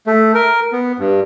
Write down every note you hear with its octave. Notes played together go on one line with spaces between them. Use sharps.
A3
A#4
B3
G2